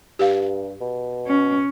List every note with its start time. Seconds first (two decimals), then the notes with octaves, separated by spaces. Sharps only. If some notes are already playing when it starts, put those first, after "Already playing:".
0.19 G2 G4 F5
0.81 B2
1.27 C#4